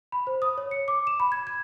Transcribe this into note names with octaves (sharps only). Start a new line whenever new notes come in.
B5
C5
D#6
C#5
C#7
D6
E7
B5
G#6
G#6